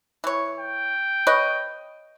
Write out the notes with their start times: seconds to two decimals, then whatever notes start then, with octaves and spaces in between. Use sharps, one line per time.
0.24 E3 C#5
0.60 G5
1.27 B4 C#5 D#5